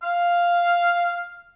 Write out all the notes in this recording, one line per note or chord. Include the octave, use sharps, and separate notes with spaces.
F5